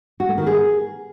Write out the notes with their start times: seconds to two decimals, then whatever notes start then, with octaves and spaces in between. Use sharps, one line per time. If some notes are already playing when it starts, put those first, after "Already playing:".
0.20 F#4
0.29 A3
0.38 D#3
0.47 G#4